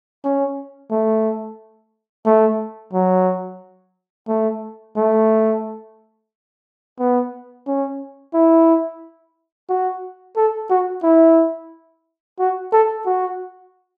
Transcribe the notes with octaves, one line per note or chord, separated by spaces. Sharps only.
C#4
A3
A3
F#3
A3
A3
B3
C#4
E4
F#4
A4
F#4
E4
F#4
A4
F#4